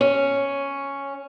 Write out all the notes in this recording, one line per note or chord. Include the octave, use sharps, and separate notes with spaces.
C#4